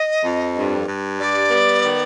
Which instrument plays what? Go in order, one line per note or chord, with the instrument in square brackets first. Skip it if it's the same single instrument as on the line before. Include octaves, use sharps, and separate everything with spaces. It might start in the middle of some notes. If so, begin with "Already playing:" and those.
Already playing: [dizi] D#5
[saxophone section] F2
G2
G2
[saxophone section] G3 [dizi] D5
[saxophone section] B3
D#3